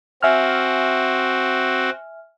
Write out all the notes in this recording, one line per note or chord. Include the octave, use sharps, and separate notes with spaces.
C4 F#4 E5 G#5 F6